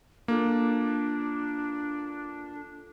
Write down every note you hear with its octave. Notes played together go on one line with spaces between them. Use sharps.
A#3 D4 F4 A4